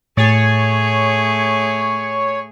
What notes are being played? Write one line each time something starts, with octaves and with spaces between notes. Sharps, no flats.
A2 A3 G#4 C#5 A6